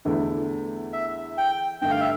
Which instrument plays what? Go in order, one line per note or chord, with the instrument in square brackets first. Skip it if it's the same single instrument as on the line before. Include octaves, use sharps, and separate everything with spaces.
[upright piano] E2 D3 A3 E4
[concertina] E5
G5
[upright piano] G2 D3 A3 [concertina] G5
[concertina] F5
E5